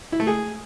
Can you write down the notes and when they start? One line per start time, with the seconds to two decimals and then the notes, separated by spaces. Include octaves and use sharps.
0.12 E4
0.20 A3
0.27 G#4